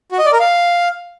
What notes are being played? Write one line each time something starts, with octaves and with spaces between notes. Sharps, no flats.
F#4
D#5
D5
A#4
F5